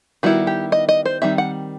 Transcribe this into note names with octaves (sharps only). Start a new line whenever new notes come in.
D#3 G3 B3 E4 F#4
G4
D#5
D#5
C5
D#3 G3 C4 E5
F#5